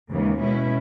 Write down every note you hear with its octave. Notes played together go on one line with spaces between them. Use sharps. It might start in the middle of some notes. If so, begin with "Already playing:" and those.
D#2 C#3 E3 G#3
B2 G#3 C#4 E4